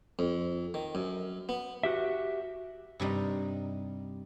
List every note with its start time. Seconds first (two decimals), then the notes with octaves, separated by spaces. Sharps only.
0.19 F2
0.74 D#3
0.95 F#2
1.49 B3
1.83 F#4 G4 E5
3.00 G2 C3 G3 D#4